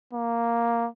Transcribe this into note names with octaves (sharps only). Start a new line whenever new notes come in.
A#3